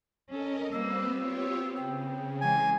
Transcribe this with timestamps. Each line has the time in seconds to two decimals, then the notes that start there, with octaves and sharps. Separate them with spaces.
0.30 C#4 A4 A#4 D#5
0.72 G3 A#3 C4 B4 C5 E6
1.10 B3 C4 F4 G4 C#5
1.76 C#3 G5
2.41 E3 G#3 G#5